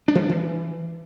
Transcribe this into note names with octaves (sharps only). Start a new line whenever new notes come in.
D4
E3
D4
E3